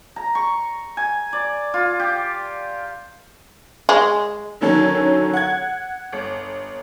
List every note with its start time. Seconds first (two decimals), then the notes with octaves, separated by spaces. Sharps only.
0.16 A#5
0.35 C#6
0.97 G#5
1.33 D5
1.74 F4
1.99 G4
3.89 G#3
4.61 D3 D#3 F#3 C#4 A4
5.33 F#5 G#6
6.12 G1